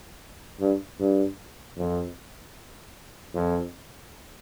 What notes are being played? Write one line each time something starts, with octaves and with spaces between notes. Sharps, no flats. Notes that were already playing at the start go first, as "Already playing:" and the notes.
G2
G2
F2
F2